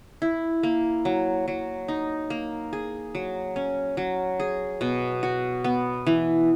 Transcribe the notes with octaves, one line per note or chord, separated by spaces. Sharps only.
E4
A#3
F#3
F#3
D#4
A#3
G#4
F#3
C#4
F#3
G#4
B2
F#4
B3
E3